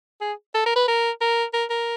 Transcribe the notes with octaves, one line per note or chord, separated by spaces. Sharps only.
G#4
A4
A#4
B4
A#4
A#4
A#4
A#4